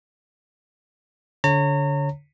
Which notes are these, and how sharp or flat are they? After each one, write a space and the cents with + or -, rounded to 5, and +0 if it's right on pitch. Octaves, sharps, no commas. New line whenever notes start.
D3 -25 C#5 -10 A#5 -35